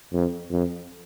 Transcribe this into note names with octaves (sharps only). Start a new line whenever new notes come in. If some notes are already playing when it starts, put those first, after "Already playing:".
F2
F2